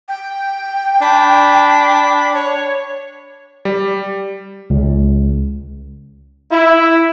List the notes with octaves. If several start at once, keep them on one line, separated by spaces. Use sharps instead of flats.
G5
D4 B5
C#5
G3
C#2
E4